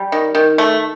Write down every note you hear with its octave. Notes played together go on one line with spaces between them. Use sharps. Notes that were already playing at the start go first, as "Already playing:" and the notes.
Already playing: G3
D#3
D#3
A3